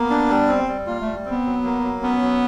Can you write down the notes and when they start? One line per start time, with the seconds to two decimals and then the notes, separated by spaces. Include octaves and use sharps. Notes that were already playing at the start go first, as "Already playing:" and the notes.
Already playing: A#3 B3
0.10 D4
0.30 G3
0.48 C4
0.68 G3
0.87 A#3 F4
1.01 G3 A3
1.25 C4
1.31 B3
1.45 F#3
1.64 A#3
1.83 F#3
2.02 B3 C#4
2.22 F#3